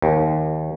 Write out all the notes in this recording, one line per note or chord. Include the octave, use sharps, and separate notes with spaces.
D#2